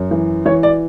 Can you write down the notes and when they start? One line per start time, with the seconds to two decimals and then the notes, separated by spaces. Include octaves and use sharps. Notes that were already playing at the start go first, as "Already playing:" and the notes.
Already playing: F#2
0.11 E3
0.46 E3 C#5
0.63 D5